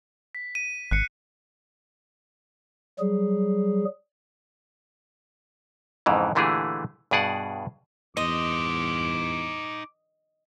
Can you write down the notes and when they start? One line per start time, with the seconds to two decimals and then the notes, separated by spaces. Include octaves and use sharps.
0.35 B6
0.55 D#7
0.91 G#1 F#6 C7 C#7
2.99 F#3 G3 G#4
6.06 F2 G#2 C#3 E3
6.35 A#2 D3 E3 A3 G4 G#4
7.11 G2 B2 G#4 D5 F#5
8.17 E2 D#4 C5 D#5 D6